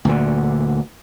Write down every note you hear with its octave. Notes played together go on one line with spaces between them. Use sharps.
D2 A#2 D3